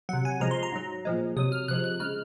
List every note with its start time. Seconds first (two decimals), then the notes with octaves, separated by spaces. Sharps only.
0.09 C3 F#3 F#5
0.25 G#5
0.40 C3 F3 G#3 A#5
0.51 C6
0.63 A#5
0.72 G#2 F#3
1.05 A#2 F3 G#3
1.37 C3 F#3 D#6
1.52 F6
1.68 C3 F3 G#3 F#6
1.84 F#6
2.00 C#3 G#3 F6